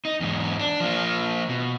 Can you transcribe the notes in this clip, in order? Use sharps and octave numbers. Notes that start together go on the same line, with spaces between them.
D#4
E2 G#2
D4
F3 A#3
B2